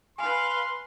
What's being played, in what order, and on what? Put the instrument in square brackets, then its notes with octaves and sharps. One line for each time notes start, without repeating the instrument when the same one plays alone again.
[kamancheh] B4 F5 [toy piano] G#5 B5 [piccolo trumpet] C6